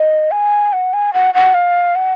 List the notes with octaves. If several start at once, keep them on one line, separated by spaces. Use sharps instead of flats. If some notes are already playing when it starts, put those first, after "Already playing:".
Already playing: D#5
G#5
F#5
G#5
F#5
F#5
F5
F#5